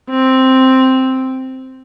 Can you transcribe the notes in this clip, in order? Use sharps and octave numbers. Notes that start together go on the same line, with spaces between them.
C4